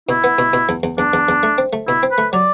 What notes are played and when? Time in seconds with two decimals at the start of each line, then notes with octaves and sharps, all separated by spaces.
0.09 B2 E4
0.24 B3
0.38 B2
0.53 B2
0.69 E2
0.83 E2
0.98 E2 D4
1.13 E2
1.29 E2
1.43 A3
1.58 C4
1.73 A3
1.88 B2 E4
2.03 C4
2.11 B4
2.18 A3
2.33 F#3 D5